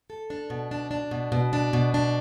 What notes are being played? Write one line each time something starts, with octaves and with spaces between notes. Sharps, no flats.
A4
D4
B2
D4
D4
B2
B2
D4
B2
D4